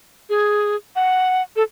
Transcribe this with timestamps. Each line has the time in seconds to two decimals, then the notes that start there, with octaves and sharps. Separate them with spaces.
0.29 G#4
0.96 F#5
1.56 A4